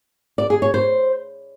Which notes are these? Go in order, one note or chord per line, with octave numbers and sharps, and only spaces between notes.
D5
G#4
C#5
C5